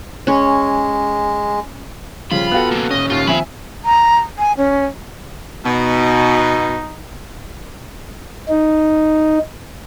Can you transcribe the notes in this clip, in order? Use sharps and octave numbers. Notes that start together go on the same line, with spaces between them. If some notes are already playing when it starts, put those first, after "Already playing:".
G#3 C#4 C#5
C#3 F3 G3 F4 B5
B3 F#4 A4 F5 G5 F#6
A#3 C#4
A#2 C#4 D#5
D#2 F4
D#2 F3 C4 E5 F5 G#5 B5
A#5
G#5
C#4
B2 D#4
D#4